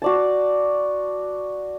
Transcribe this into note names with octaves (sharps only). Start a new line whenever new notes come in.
F#4 D5 A5